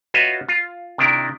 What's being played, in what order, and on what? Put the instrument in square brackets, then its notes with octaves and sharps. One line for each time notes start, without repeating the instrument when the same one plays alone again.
[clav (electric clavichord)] F4 F#4 B4 C#5 D#5 E5
F4
C3 D#3 D4 E4 A#4